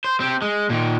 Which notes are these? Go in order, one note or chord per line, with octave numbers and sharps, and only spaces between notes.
C5
C4 G4
G#3
A#2 D#3